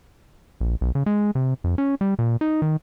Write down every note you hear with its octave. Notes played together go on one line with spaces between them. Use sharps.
A#1
B1
C#3
G#3
C3
F2
C#4
G3
A#2
D#4
D#3